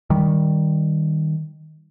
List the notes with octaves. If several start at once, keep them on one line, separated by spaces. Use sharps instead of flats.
D#3 G3